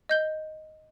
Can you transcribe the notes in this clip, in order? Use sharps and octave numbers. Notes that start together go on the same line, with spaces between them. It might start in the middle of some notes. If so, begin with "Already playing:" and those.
D#5 G6 G7